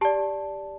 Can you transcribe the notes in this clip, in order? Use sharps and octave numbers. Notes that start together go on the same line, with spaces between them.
G4 D5 A5